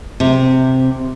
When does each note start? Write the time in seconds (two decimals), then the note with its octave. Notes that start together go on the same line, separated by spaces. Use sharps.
0.20 C3